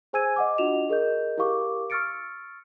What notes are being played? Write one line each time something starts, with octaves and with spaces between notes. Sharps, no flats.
G#4 C5 G#5 E6 G#6 D#7
D#5 F#5 D6
D4 F4 F#4 D#5 E7 F7
G#4 A#4 D#5 G6
E4 G4 A#4 F5 C#6 D6
C#6 E6 F6 A6 C#7 D7